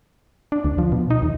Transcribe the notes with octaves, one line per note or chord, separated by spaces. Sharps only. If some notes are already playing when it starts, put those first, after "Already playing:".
D4
D2
F3
B2
D#4
D#2